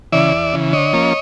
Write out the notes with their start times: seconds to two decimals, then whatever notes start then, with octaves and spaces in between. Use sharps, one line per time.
0.12 C#3 E3 D5 E5
0.32 E2
0.53 C#3 E3
0.73 D3 C#5 D#5
0.93 F3 A#3 C#4